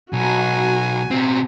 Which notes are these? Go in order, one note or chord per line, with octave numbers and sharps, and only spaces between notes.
B1 F#4 G#5
B2 C4